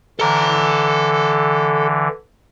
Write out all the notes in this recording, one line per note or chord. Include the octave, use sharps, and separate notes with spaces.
D3 E3 A4 A#5